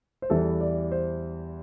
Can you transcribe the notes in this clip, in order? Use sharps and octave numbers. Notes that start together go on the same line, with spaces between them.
C5
E2 E3 G3 A4
D5
C5